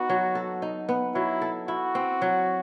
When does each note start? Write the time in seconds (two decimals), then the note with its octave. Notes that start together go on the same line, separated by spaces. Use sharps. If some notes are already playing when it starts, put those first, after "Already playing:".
Already playing: B3 D#4 F#4
0.09 F#3
0.35 A4
0.62 D#4
0.89 B3
1.15 F#3 E4
1.42 A4
1.68 E4 F#4
1.95 C4
2.22 F#3